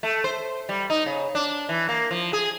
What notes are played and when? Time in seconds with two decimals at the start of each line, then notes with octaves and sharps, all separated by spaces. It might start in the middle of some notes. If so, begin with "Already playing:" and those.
0.03 A3
0.24 C5
0.69 G3
0.90 D#4
1.06 C#3
1.35 D4
1.69 E3
1.89 A#3
2.11 F3
2.33 G#4